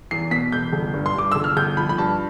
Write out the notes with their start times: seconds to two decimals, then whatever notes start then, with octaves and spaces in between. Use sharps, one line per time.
0.11 E2 C7
0.31 B2 B6
0.52 E1 G6
0.73 G1
0.94 G2
1.06 C6
1.15 G2 D6
1.32 G1 E6
1.44 F6
1.57 G1 G6
1.77 F3 B5
1.89 B5
1.98 G2 A5